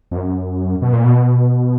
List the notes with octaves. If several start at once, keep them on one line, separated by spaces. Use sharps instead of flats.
F2
F#2
B2
A#2
B2